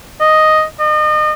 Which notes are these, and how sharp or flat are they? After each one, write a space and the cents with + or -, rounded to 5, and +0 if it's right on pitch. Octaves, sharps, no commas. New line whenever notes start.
D#5 +0
D#5 -35